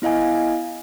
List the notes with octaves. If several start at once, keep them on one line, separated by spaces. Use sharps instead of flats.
B3 E4 D#5 F5 G#5